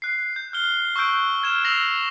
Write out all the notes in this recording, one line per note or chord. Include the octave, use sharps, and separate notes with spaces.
F#6 C7
G6
F6 G7
C#6 E6 F#6 G6 D7
F6 G#6 E7
E6 A#6 C7 F7 F#7